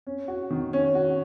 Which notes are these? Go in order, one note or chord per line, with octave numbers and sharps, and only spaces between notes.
C#4
F#4
D#3
C#4
F#4